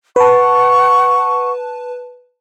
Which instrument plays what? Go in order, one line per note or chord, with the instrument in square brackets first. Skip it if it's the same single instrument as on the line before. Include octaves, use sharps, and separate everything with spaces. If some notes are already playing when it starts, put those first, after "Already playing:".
[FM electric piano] B4 A5 [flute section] F#5 C#6